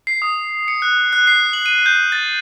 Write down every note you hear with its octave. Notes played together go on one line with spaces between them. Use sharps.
C7
D#6
C#7
F#6
F#6
C7
F#7
D#7
G6
A6